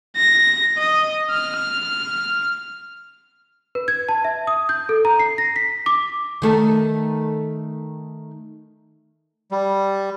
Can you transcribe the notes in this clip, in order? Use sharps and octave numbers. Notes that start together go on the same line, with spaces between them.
A#6
D#5
F6
B4
G#6
A5
E5
D#6
G6
A4
A#5
C7
A#6
B6
D6
D#3 A3 A4
G3